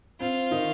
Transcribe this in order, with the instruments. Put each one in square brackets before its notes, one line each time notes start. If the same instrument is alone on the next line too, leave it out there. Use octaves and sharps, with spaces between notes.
[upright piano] C4 [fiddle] F4
[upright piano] D#3 D#4